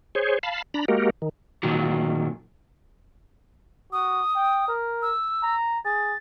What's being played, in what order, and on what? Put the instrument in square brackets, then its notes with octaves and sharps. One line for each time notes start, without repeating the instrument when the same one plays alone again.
[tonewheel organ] G#4 C5 C#5
F5 A5 B5
D4 A#5 B5
G#3 A#3 F#4 G4 A#4
D#3
[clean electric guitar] A#2 D#3 F3 F#3
[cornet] F#4 [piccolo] D#6
[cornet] G5
A#4
[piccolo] E6
[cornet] A#5
[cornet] G#4 [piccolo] A6